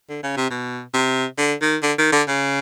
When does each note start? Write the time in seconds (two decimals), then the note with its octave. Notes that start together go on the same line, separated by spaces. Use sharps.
0.10 D3
0.23 C#3
0.37 C3
0.50 B2
0.94 C3
1.38 D3
1.61 D#3
1.83 D3
1.98 D#3
2.12 D3
2.27 C#3